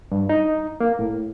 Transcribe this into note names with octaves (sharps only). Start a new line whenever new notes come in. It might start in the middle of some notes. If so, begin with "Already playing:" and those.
G2
D#4
A#3
A2